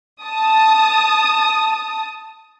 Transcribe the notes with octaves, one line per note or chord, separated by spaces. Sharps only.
A5 D#6